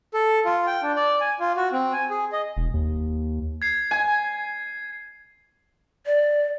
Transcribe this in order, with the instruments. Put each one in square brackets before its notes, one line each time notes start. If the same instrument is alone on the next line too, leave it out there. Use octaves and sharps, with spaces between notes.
[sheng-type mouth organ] A4
F4
G5
D4
D5
G#5
F4
F#4
C4
G#5
G#4
D#5
[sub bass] E1
D#2
[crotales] G#6 C7
[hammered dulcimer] G#5
[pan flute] D5